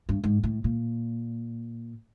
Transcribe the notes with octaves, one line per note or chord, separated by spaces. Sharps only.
G2
G#2
A2
A#2